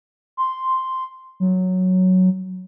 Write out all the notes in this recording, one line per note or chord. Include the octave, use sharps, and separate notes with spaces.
C6
F#3